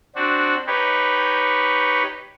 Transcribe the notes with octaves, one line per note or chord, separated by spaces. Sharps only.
C4 D4 F#4
D#4 G4 B4 C#5